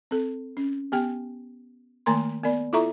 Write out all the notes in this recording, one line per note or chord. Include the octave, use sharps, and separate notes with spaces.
C4 A4
C#4
B3 G4 G5
D#3 A3 A#3 A#4 A#5 C6
B3 A#4 D5 B5
E4 F4 A4 E5 A#5 C#6